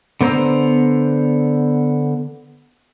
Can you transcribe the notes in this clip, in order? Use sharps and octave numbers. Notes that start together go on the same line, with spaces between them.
D3 B3 C5 A#5 E6